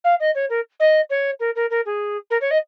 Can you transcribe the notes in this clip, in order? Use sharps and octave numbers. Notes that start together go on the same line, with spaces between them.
F5
D#5
C#5
A#4
D#5
C#5
A#4
A#4
A#4
G#4
A#4
C#5
D#5